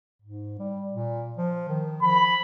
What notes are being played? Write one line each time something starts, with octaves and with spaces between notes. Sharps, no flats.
G#2
G3
A#2
F3
D#3
F3 B5